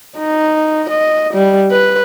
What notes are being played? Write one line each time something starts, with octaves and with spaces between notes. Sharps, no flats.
D#4
D#5
G3
B4